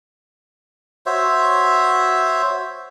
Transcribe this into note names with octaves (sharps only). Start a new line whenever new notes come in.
F#4 C5 C#5 E5